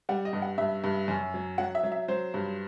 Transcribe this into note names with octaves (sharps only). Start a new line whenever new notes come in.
G3 F#5
D#5
G2
F#5
G2 E5
G2
F#2
F#3
F#3 F#5
E5
F#3
E5
F#3 C5
G2